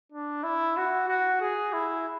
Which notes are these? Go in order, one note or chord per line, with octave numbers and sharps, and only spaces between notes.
D4
E4
F#4
F#4
G#4
E4